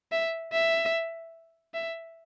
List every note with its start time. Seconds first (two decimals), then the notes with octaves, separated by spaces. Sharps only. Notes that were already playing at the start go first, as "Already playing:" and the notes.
0.12 E5
0.53 E5
1.74 E5